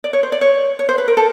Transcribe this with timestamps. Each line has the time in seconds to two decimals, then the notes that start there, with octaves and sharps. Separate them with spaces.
0.04 D5
0.13 C#5
0.23 C5
0.32 D5
0.41 C#5
0.79 C#5
0.89 C5
0.98 B4
1.08 A#4
1.17 A4